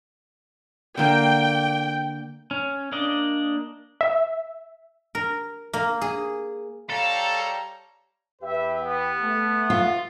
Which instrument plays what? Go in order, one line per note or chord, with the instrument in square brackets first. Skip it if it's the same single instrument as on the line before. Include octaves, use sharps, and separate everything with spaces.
[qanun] D3 A#3 [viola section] G5
[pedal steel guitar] C#4
A#3 D4 D5 D#5
[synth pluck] E5
[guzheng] A#4
A#3
G#4
[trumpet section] G3 C#5 A#5 [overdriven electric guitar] A4 [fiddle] F5 A5
[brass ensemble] E2 G4 B4 [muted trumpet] E5
[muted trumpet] B3
[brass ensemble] A3
[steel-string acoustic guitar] F4